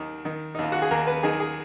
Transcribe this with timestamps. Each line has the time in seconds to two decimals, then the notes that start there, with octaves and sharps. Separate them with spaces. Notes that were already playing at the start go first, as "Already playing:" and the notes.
Already playing: D#2 D#3
0.25 D#3
0.55 D#2 D#4
0.64 F4
0.72 F#4
0.82 G#4
0.91 D#2 A#4
1.07 B4
1.23 D#3 G#4
1.40 G#4